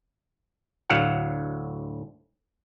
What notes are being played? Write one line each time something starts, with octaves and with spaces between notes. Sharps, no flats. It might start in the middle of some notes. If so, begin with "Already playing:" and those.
D2 A2 F#3 A4 F5 F#5